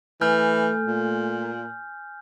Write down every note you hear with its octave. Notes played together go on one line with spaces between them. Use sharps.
E3 A3 G#5 F6 G6
A#2